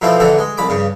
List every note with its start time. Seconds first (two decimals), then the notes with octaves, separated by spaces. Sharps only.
0.02 B2 E3 F3 A3 C4
0.20 A1 D3 E3 A3 A4
0.39 G#3
0.58 C2 B5 D6
0.69 G2 C#3